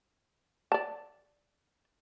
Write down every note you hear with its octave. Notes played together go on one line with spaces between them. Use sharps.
D5 A5